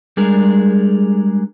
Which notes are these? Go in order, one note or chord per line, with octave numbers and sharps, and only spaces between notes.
G3 G#3 D4 G#4 A#4